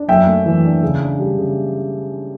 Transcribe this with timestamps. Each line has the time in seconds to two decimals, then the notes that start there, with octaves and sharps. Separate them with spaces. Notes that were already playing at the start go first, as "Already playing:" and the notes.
Already playing: D4
0.08 F#2 E5 G5
0.27 A3
0.46 E3
0.64 D4
0.83 C#3
1.01 D4
1.19 G3
1.38 C#3